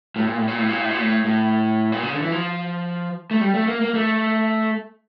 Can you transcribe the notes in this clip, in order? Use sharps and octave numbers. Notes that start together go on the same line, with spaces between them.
A2
A#2
A2
A#2
A2
A#2
A2
A#2
A2
A2
A#2
C#3
D3
E3
F3
A3
G3
A3
A#3
A#3
A3